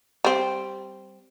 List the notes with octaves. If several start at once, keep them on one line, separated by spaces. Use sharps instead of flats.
G3 C4